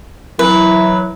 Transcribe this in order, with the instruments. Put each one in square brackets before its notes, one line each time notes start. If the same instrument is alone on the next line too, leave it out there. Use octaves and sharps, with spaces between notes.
[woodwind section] E3 F#3 [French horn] E4 [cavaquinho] B4